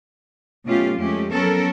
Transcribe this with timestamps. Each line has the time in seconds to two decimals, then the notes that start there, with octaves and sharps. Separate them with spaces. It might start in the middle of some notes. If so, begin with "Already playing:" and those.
0.65 B2 F#3 A3 C#4 F4 G4
0.98 F2 G#3 A3 C#4 G4
1.32 F#3 B3 C#4 A4 A#4